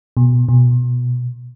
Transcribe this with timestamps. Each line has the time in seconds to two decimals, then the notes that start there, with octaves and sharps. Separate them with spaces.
0.17 B2
0.49 B2